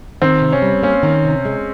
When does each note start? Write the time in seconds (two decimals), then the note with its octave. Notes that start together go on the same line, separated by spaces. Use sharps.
0.22 D#3 C4
0.42 C3
0.52 C#4
0.62 G3
0.83 A#3 C#4
1.03 D#3
1.25 C3
1.45 G#3